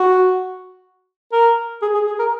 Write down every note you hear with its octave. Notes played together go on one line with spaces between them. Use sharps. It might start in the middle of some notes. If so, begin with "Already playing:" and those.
Already playing: F#4
A#4
G#4
G#4
G#4
A#4